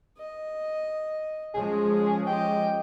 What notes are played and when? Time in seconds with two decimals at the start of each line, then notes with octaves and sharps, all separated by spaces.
0.18 D#5
1.54 F3 G#3 C#4 G#4
2.27 G4 D#5 G5